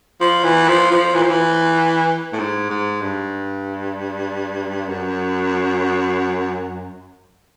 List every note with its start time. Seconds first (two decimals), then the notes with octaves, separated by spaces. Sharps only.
0.21 F3
0.44 E3
0.68 F3
0.91 F3
1.15 E3
1.22 F3
1.29 E3
2.33 A2
2.39 G#2
2.70 G#2
3.01 G2
4.89 F#2